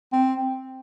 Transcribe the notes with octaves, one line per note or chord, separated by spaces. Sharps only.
C4